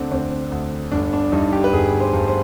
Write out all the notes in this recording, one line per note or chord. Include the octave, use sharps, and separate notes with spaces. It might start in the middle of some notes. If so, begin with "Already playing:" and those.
Already playing: D2 D3 C4 D4
D2 C4
D2
G1 D4
D4
G2 D#4
G4
B4
G1 G#4
C5
G2
C5